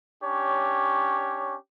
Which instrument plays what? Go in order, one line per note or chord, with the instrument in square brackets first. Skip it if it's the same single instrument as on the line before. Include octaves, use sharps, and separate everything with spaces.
[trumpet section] C#4 D4 G4 C#5